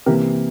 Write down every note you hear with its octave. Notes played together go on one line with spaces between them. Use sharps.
C3 E3 A#3 G4 A#4